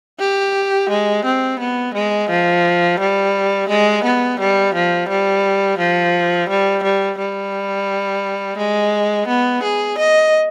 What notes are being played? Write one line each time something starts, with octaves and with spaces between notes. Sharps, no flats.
G4
G#3
C4
B3
G#3
F3
G3
G#3
B3
G3
F3
G3
F3
G3
G3
G3
G#3
B3
G#4
D#5